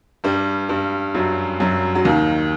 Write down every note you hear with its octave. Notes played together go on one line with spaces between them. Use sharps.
G2 G3
G2 G3
F#2 F#3
F#2 F#3
F#3
D#2 D#3